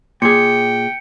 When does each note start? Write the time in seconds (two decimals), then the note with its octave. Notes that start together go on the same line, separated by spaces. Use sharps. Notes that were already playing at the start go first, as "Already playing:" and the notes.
0.22 A#2 G#4 G5 C#7